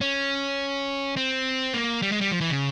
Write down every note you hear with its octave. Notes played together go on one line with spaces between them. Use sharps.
C#4
C4
A#3
G3
G#3
G3
F3
E3
C#3